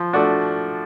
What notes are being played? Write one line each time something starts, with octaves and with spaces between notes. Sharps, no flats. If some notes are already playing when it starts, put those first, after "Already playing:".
Already playing: F3
A3 D4 F#4